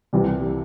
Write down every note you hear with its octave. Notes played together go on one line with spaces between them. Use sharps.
C2 C3 E3 G3